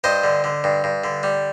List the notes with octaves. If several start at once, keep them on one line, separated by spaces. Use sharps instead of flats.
G2 C5 D#5
D3
D3
G2
G2
D3
G3